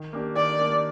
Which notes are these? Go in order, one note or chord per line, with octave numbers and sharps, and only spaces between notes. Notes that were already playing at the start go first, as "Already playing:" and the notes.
Already playing: D#3
A#3 D4 G4
D#3 D5
A#3 D4 G4